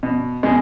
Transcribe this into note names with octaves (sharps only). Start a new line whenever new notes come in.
B2
B2 G#3